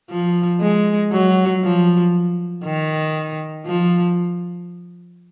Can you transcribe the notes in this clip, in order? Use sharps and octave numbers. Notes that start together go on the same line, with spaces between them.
F3
G#3
F#3
F3
D#3
F3